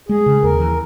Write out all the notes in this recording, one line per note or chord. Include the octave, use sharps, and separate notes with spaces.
G#3 G#4
C#3
D#2 A#4
E3